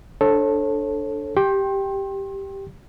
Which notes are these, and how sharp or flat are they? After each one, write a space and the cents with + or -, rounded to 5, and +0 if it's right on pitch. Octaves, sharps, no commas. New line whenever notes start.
D4 +0 A4 +0 C#5 -35
G4 +0 G5 +0 C6 +35